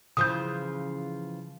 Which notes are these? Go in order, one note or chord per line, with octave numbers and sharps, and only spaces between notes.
C#3 E3 F3 D#6 G6